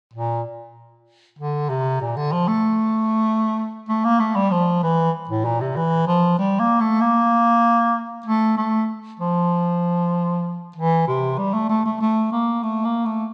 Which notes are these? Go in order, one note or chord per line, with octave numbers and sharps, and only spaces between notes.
A#2
D3
C3
A#2
D3
F3
A3
A3
A#3
A3
G3
F3
E3
A2
A#2
C3
E3
F3
G3
A#3
A3
A#3
A3
A3
F3
E3
C3
G3
A3
A3
A3
A3
A#3
A3
A#3
A3